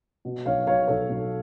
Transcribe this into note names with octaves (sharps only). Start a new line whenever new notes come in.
B2
B1 C#5 F5
B1 C#5 F5
B1 A4 C#5
B1